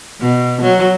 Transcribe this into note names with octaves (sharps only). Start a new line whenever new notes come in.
B2
F#3